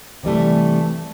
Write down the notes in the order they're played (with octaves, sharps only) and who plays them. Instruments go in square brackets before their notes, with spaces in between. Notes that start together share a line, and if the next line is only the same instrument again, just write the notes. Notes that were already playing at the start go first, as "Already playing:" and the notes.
[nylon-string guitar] C3 E3 G3 A3